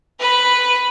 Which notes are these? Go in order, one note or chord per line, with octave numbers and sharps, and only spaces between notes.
B4 B5